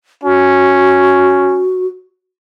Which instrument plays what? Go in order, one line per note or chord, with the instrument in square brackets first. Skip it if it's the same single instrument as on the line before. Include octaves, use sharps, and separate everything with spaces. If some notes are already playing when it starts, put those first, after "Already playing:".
[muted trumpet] C#4 [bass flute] F#4